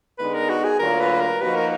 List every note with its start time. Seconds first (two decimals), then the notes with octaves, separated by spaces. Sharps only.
0.18 D3 G#3 B3 D#4 B4
0.34 A#4
0.49 F#4
0.64 G#4
0.79 D2 D3 F#3 A#3 F4 A#4
1.00 B4
1.20 A#4
1.41 F3 A#3 D#4 F#4 B4
1.55 A#4